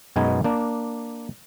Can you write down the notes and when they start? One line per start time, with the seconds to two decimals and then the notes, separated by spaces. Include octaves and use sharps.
0.16 F#2 B2 G#3 B3 D#4 G#5
0.44 A#3 D4